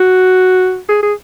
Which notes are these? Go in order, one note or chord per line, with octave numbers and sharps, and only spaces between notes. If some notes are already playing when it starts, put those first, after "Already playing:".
Already playing: F#4
G#4
G#4